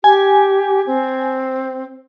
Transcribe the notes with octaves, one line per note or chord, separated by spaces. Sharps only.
G4 G#5
C4